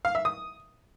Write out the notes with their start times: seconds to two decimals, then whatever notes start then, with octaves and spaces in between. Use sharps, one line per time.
0.05 F5
0.15 E5
0.25 D#6